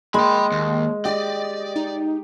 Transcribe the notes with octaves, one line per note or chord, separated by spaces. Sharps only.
G#3 A#3 G5 B5
D#2
G4 D5 D#5
D#4